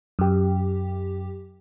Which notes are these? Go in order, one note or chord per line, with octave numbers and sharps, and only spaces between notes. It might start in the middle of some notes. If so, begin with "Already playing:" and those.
F#2 G4